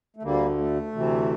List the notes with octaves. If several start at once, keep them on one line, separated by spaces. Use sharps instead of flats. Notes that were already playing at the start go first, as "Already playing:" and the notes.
A3
D2 D3 G3 A#3
A3
D2 C3 E3